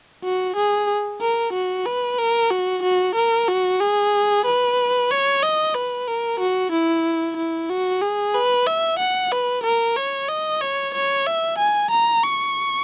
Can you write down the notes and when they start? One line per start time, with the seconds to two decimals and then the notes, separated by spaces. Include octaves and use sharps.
0.23 F#4
0.56 G#4
1.21 A#4
1.53 F#4
1.86 B4
2.18 A#4
2.50 F#4
2.83 F#4
3.15 A#4
3.48 F#4
3.80 G#4
4.45 B4
5.10 C#5
5.42 D#5
5.74 B4
6.07 A#4
6.40 F#4
6.72 E4
7.37 E4
7.70 F#4
8.01 G#4
8.34 B4
8.66 E5
8.99 F#5
9.32 B4
9.63 A#4
9.96 C#5
10.28 D#5
10.61 C#5
10.94 C#5
11.26 E5
11.58 G#5
11.90 A#5
12.23 C#6